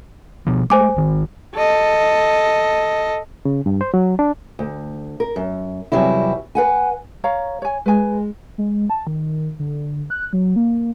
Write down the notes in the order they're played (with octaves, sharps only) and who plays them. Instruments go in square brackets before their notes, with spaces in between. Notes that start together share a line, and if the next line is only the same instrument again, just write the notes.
[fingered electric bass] B2 F3 B3
[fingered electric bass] G#3 A3 [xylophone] C5 G#5 D6
[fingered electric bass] G#1 D#3
[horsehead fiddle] A4 D#5
[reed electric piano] C#3
G2
C5
F#3
D4
[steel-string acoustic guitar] D2
A#4
F#2
E2 C3 F#3 G3 E4
B4 F#5 G#5
[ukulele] C#5 F5 A#5
C#5 G#5
[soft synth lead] G#3 [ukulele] B4 G#5
[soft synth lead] G#3
A5
D#3
D3
F#6
F#3
A#3